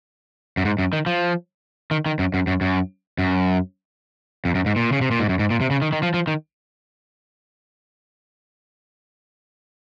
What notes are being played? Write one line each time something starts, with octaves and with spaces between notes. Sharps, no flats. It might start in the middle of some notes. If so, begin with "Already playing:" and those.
F#2
G#2
F#2
D#3
F3
D#3
D#3
F#2
F#2
F#2
F#2
F#2
F2
F#2
G#2
A#2
C#3
C3
A#2
G#2
F#2
G#2
A#2
C3
C#3
D#3
D#3
F3
F3
D#3